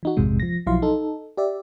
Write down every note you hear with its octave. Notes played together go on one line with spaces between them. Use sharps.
E3 D#4 F#4
A#1 F2 G#2 C3 G#3
F3 A#6
B1 F3 F#3 E4 F5 C6
D#4 A4
G4 D5 E5